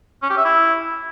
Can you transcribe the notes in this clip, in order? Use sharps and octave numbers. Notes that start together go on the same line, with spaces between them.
C#4
G4
E5
E4